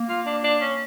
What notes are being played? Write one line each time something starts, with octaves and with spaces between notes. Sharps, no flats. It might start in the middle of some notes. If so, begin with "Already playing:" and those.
Already playing: A#3
F4
D4
D4
C#4